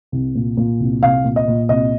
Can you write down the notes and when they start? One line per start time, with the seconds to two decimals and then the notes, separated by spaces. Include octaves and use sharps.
0.12 C2
0.35 A#2
0.57 A#2
0.80 C2
1.02 C2 F5
1.24 A#2
1.36 D#5
1.48 A#2
1.69 C2 D#5